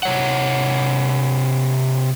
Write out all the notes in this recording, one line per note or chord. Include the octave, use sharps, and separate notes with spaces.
C3 C#5 F#5